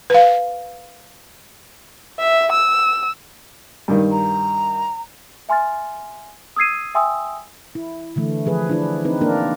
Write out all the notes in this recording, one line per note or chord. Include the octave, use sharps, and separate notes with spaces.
B4 F5
E5
E6
G2 D#3
A#5
E5 G#5 C6 F6 A6
D#6 E6 G#6 C7 D#7
E5 G5 G#5 C6 D#6 E6
E4
D3 E3 A3
E3 F3 G#4 B4
D4 E4 B4
C4 D#4 B4
A#3 D4 A#4